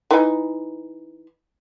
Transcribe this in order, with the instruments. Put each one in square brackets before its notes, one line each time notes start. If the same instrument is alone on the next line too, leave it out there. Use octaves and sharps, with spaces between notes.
[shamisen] E3 D#4